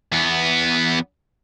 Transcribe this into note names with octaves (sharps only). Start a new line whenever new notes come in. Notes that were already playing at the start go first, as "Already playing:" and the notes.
E2 B3